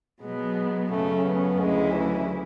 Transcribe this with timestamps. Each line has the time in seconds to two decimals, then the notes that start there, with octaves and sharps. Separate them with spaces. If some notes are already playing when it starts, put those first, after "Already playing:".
0.21 B2 F#3 G#3 B3
0.90 F#2 C#3 F#3 A3 C#4
1.25 B3
1.60 D2 C#3 F#3 G#3 C#4 E4
1.94 E3